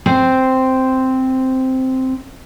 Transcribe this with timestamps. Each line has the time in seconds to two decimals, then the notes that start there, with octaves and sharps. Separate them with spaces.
0.06 C4 C5